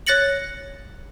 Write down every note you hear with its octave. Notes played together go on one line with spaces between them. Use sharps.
C#5 F#6 A6 A#6 C#7 F#7